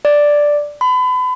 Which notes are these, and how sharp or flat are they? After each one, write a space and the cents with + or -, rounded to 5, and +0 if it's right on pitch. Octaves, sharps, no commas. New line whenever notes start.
D5 +0
B5 +35